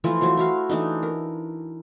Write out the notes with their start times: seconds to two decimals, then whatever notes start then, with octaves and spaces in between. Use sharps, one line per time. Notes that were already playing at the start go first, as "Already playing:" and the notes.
0.04 E3 F3 A3 F4
0.21 E3 F#3 A3 C5
0.37 E4 F#4 F5
0.69 E3 A3 D4 D#4
1.03 A#4